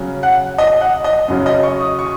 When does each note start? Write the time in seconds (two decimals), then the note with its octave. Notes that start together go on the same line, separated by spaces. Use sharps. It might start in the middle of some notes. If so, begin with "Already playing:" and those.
Already playing: C#3 F#3 C#4
0.23 F#5
0.58 D#5
0.81 F#5
1.04 D#5
1.28 F#2 C#3 F#3 C#4
1.46 D#5
1.63 C#6
1.81 D#6
1.99 C#6